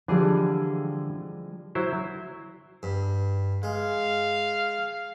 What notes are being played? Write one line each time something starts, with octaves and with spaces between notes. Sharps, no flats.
D3 E3 F3 G3 G#3 G#4
F#3 E4 C5
G2
G#3 F5